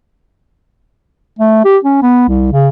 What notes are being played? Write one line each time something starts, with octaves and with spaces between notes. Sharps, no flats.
A3
G4
C#4
B3
C2
C#3